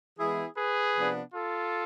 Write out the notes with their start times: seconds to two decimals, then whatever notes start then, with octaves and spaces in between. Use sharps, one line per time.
0.18 E3 G#3 B3 E4 G#4
0.56 G#4 B4
0.95 C3 F3 B3 D4
1.33 F4 A4